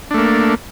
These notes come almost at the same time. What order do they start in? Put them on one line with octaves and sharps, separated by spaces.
D4 A3 A#3